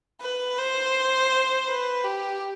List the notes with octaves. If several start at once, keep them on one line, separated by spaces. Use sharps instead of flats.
B4
C5
B4
G4